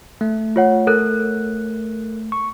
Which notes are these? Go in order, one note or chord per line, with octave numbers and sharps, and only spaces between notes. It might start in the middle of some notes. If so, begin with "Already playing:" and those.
A3
F4 C#5 F#5
A4 A#4 F#6
C#6